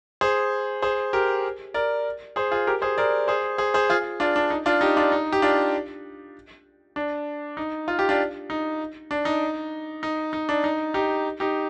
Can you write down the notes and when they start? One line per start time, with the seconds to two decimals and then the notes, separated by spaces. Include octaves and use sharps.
0.21 G#4 C5
0.82 G#4 C5
1.13 G4 A#4
1.74 A#4 D5
2.36 G#4 C5
2.51 F4 G#4
2.67 G4 A#4
2.82 G#4 C5
2.98 A#4 D5
3.28 G#4 C5
3.58 G#4 C5
3.74 G#4 C5
3.90 F4 G#4
4.20 D4 F4
4.36 D4
4.50 D#4
4.66 D4 F4
4.81 D#4 G4
4.97 D4 F4
5.12 D#4
5.32 G4
5.42 D4 F4
6.96 D4
7.57 D#4
7.88 F4
7.99 G4
8.09 D4 F4
8.50 D#4
9.11 D4
9.25 D#4
10.03 D#4
10.33 D#4
10.49 D4
10.64 D#4
10.94 D#4 G4
11.40 D#4 G4